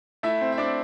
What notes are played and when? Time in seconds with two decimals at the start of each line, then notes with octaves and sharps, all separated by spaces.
0.23 A3 E4 E5
0.41 C4
0.52 E5
0.58 C4 D4 D5